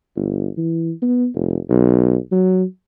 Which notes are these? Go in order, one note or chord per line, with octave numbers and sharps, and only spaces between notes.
G1
E3
B3
F1
B1
F#3